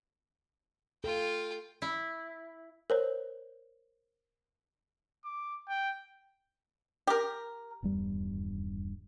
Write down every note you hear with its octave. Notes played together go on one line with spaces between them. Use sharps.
F4 A4 G5
E4
A#4 C5 C#5
D6
G5
G4 A#4
D#1 E2 G2 G3